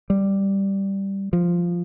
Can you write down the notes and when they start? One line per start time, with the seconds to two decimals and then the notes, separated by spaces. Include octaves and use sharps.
0.10 G3
1.33 F3